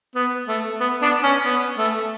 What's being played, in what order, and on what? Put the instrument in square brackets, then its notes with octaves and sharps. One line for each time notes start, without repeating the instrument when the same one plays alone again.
[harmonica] B3
A3
B3
B3 D4
C#4
B3
A3